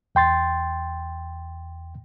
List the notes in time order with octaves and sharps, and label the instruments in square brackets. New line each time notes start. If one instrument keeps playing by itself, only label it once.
[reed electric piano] E2 G5 C6 A6